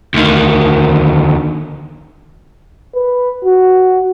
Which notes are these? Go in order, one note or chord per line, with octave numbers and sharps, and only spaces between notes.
D2 D#3
B4
F#4